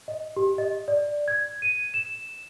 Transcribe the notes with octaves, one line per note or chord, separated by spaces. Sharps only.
D#5
G4
D#5
D5
G#6
D#7
E7